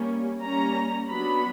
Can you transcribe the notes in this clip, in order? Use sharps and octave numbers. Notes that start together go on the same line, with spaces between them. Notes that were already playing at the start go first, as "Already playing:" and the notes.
Already playing: G3 A#3 C#4
G3 A#3 C#4 A#5
F#3 B3 D4 B5